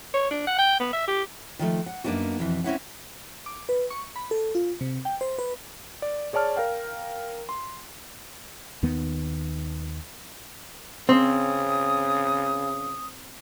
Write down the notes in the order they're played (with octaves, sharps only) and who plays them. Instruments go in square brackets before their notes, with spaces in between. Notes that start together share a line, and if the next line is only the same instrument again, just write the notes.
[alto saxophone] C#5
D4
F#5
G5
B3
E5
G4
[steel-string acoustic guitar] D#3 F3 A3
F#5
F#2 A#3 B3 D4 D#4 F#4
F2 B2 E3
C4 C#4 E4 F#5
[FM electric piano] D6
B4
C#6
B5
A4
F4
C3
G5
C5
B4
[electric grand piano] D5
G#4 C#5 D5 A5 F6
A#4 F5 G5
C6
[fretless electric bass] D#2 D#3 B3
[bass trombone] C#3 [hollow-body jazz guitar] C4 [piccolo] D#6